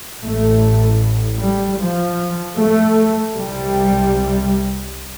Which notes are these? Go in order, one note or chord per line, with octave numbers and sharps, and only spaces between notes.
A1 A2 A3
G3
F3
A3
C2 C3 G3